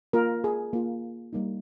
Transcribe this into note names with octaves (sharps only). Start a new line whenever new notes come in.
A#3 F4 A#4
G#4
A#3 F4
G3 A#3 D#4